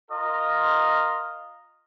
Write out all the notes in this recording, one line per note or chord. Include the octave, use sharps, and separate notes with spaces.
F4 A#4 D#5